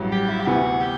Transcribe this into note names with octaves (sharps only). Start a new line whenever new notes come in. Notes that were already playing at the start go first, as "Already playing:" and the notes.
Already playing: A1 G2 F#3
G4
E4
G4
D2 C3 E3 B3 F#4
G4